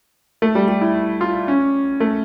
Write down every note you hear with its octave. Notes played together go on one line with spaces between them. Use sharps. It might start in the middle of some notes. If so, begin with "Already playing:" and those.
A3
G3
G3
E4
F4
C#4
A3